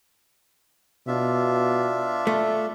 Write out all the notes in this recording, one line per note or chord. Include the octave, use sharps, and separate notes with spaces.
B2 D4 F4 E5
A3